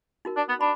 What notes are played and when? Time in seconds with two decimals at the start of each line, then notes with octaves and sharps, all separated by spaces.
0.25 D#4 F#4 A#4
0.37 D4
0.48 B3
0.61 D4 B5